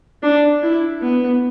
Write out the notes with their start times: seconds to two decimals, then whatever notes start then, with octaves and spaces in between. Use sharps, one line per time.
0.23 D4
0.63 E4
1.02 B3